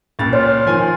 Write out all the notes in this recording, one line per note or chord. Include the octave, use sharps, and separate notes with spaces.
C#2 A#2 A6
F4 C#5
D#3 F3 G#5